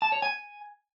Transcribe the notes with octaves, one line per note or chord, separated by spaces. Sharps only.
A5
C#5
G#5